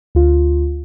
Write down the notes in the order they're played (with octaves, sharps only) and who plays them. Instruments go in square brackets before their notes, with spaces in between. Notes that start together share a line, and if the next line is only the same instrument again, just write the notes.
[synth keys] D2 F4